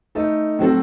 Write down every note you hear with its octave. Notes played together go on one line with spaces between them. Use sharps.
A3 D#4 A4
A2 F#3 C4 F#4 A4